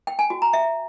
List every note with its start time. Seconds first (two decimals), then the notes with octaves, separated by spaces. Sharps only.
0.07 G5
0.19 G#5
0.30 F#4
0.42 A#5
0.53 E5